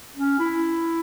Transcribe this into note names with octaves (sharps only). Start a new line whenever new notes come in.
C#4
E4